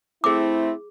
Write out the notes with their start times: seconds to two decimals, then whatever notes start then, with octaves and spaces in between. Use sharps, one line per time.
0.24 A3 C4 E4 G#4 D6